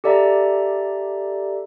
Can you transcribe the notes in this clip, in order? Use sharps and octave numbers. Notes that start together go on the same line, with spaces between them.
G4 A4 D5 E5 A#5